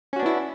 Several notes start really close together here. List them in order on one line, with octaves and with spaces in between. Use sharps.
C#4 F#4 D4 B3 E4